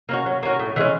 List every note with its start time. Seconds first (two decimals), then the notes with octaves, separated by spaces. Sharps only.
0.09 A#3 C#4 F#4
0.26 F#3
0.43 A#3 C#4 F#4
0.59 A2
0.76 E3 G#3 C#4